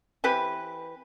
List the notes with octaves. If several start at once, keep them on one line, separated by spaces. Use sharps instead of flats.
E3 C4 G4 B4